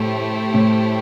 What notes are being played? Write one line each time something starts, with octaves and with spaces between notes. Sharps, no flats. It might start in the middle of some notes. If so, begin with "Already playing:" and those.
Already playing: A2 A3 E4 G4 C5
A2